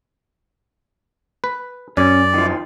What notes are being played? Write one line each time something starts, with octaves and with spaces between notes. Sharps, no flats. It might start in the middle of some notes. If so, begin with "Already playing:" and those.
B4
F#2 C#4 D5
D#3 F3